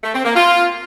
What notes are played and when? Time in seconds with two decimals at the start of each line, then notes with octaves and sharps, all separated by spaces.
0.03 A3
0.14 C4
0.25 A#3
0.36 F4